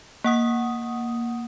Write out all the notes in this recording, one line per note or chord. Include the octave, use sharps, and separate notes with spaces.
A#3 F#5 D#6